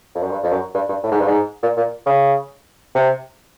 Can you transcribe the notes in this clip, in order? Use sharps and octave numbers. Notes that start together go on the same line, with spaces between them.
F2
F#2
G2
F2
F#2
G2
G2
A2
G#2
G2
G#2
A#2
A#2
C#3
C3